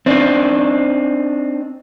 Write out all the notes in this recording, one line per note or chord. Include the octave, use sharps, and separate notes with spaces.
C4 D4 D#4